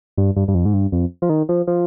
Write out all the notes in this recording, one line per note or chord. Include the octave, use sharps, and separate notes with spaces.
G2
G2
G2
F2
G#2
G2
F2
F3
D#3
F3
F3